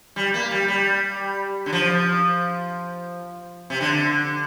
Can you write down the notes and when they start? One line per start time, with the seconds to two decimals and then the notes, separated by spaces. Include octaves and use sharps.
0.16 G3
0.34 A#3
0.51 G3
0.68 G3
1.66 D3
1.73 F3
3.70 C3
3.81 D3